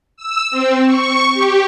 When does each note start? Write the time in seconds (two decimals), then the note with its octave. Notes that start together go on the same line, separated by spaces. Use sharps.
0.17 E6
0.51 C4
0.84 C#6
1.34 G4